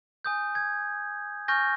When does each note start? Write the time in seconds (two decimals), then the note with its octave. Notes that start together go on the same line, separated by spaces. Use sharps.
0.25 G#5 D#6 G6
0.55 G#6
1.48 G#5 C#6 F6 G6 A#6